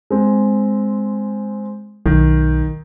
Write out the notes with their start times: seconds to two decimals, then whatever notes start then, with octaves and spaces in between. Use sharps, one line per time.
0.10 G#3 C4
2.06 B1 D#3